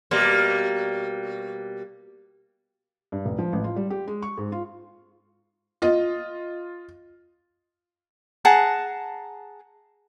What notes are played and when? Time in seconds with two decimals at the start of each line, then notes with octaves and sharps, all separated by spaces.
0.11 B2 G3 A#3
3.12 G2
3.26 F1
3.39 F3
3.53 A1
3.64 F4
3.76 G3
3.90 G4
4.08 G#3
4.23 C#6
4.38 G#2
4.52 F4
5.82 F4 D#5
8.45 G#4 F#5 A5 A#5